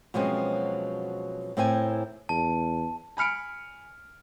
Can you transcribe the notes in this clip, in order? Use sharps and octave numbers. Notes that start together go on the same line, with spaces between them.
B2 F3 F#3 G#3 C4 C#4
A2 C4 E4 A#4 G5 G#5
E2 A5
G#5 B5 F6 C#7 D7